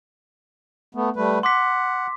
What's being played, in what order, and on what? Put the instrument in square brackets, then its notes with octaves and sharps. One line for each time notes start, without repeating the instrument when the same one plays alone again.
[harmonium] A3 B3
G3 A3 B4
[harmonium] F#5 [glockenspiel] C6 D6 B6